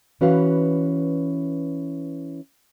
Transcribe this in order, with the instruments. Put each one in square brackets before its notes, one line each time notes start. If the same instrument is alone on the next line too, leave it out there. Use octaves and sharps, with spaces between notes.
[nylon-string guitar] E3 C#4 F#4 B4 F5